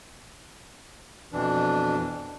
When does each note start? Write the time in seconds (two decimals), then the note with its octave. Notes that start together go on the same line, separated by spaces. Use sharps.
1.33 F2 B2 E3 D4